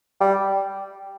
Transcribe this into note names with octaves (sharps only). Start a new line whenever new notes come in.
G3